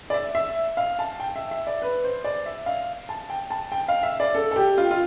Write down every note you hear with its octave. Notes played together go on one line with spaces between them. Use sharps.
D5
E5
E5
F5
A5
G5
E5
E5
D5
B4
C5
D5
E5
F5
A5
G5
A5
G5
F5
E5
D5
A4
A4
G4
F4
F4